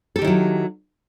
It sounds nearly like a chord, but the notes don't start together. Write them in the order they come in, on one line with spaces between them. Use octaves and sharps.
A4 G4 D#3 E4 F#3